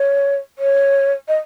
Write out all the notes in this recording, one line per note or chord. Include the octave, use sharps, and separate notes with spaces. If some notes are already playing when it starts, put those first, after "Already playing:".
Already playing: C#5
C#5
D#5